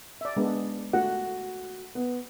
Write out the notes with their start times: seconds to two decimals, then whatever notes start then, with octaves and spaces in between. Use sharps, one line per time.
0.21 D5 E5
0.36 G#3 B3 D4
0.93 A3 F#4 F#5
1.95 B3